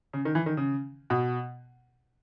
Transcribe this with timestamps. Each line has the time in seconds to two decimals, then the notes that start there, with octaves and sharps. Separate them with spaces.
0.13 C#3
0.25 D#3
0.35 E3
0.46 D#3
0.57 C#3
1.10 B2